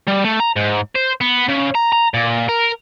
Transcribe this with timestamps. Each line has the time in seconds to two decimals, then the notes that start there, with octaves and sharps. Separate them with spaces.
0.08 G3
0.25 A3
0.40 A#5
0.56 G#2
0.96 C5
1.21 B3
1.48 C#3
1.75 A#5
1.92 A#5
2.14 A#2
2.49 A#4